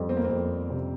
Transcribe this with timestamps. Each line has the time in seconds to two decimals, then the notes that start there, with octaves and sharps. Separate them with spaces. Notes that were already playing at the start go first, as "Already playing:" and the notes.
Already playing: F2 G3
0.09 C4
0.17 A#3
0.24 C4
0.29 F2
0.70 C3